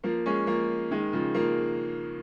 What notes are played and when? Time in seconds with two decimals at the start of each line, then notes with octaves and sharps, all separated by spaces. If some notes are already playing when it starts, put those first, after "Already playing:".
0.04 F3 A#3
0.26 G#3 C#4
0.47 F3 A#3
0.91 D#3 G#3
1.13 C#3 F3
1.35 F3 A#3